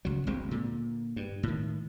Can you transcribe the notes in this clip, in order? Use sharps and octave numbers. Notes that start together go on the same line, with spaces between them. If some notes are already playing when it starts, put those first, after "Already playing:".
C#2 F#3
G1 D2 G#3 C4
A#2 D3
G2
A2 D#3